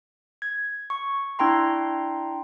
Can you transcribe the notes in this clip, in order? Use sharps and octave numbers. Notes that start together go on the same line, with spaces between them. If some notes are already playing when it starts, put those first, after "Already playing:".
G#6
C#6
D4 E4 G5 A#5 C6